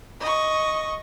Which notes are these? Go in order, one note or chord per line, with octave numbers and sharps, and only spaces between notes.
D#5 C#6